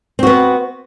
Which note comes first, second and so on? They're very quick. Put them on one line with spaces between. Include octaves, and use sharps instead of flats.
C4 F#4 B3